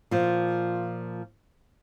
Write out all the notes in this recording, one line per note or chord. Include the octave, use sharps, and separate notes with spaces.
A#2 F3